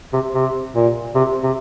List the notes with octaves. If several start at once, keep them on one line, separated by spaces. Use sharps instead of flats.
C3
C3
A#2
C3
C3